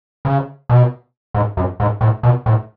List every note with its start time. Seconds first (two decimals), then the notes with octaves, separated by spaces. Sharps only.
0.25 C#3
0.69 B2
1.34 G#2
1.57 F#2
1.80 G#2
2.01 A2
2.23 B2
2.46 A2